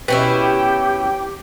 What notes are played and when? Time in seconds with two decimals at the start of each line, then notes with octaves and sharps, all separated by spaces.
0.08 B2 C#4 E4 G4 B4 G5